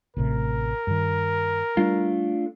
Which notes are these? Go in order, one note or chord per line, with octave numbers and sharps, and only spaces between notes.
A1 A2 C3 A#4
G2 D#3
G3 A3 D4 F4